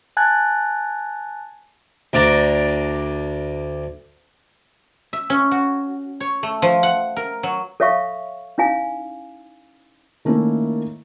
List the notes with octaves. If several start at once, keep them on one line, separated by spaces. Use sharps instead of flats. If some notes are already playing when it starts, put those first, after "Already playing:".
G#5 A5 F#6 G#6 A6
D2 D4 D5 A#5
E5
C#4
F#4
C#5
A3
F3
F#5
A#4
F#3
A4 C#5 E5 F5 C#6
C#4 D#4 E4 F5 G#5
D#3 A3 A#3 C#4 E4